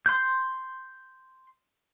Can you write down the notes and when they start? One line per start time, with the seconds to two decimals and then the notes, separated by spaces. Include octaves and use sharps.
0.06 C6 G6